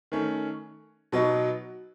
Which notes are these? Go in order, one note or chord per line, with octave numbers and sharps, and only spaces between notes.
D#3 A3 C#4
B2 F#3 B3 D#4